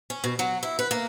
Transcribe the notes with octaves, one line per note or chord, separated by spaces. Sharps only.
C#4
B2
F#3
E4
B4
A#3